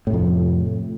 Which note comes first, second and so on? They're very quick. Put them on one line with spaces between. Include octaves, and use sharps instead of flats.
A2 C3 F2